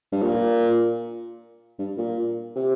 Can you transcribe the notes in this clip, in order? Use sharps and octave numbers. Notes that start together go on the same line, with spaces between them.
G2
A#2
G2
A#2
C3